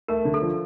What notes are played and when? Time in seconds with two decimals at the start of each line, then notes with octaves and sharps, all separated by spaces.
0.08 A3 A#4
0.25 D3
0.34 A4
0.42 F3